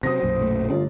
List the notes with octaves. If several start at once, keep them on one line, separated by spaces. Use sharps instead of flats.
C3 D#3 F#3 C5 D#6 A#6
B1 F#2 A#2
A3
G1 F4 D5